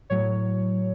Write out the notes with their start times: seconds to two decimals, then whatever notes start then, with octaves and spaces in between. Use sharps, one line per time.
0.10 A2 F#3 C#5